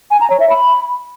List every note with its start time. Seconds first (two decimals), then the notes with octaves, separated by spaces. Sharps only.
0.11 G#5
0.20 A#5
0.30 C#5
0.40 E5
0.49 B5